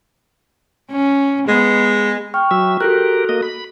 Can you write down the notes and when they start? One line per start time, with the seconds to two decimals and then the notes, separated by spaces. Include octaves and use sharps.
0.91 C#4
1.48 G#3 B3
2.34 G5 C#6 F6
2.51 F#3 E5
2.81 F#4 G4 A4 A#4 F#6
3.29 A#3 D#5
3.43 B5